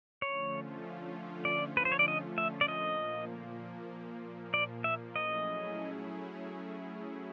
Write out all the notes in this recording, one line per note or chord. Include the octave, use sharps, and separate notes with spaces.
D3 F3 A3 C#4 F4 C#5
D5
B4
C5
C#5
D5
D#5
E5
D5
A#2 F3 A#3 D#5
D5
E5
F#3 A3 C#4 E4 G#4 D#5